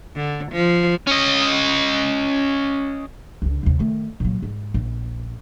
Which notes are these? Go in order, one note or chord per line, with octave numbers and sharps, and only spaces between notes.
D3
F3
C#4 D#5
C#2 D3
D#2 C3
D#3 A3
A#2 F#3
G#2
A#1